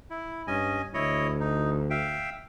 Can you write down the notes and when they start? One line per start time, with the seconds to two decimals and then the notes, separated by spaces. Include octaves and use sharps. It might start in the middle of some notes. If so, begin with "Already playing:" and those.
0.10 E4
0.47 G2 C#4 D#5 G#5
0.94 D2 E4 C#5 D#5
1.40 D#4
1.90 E5 F5 G5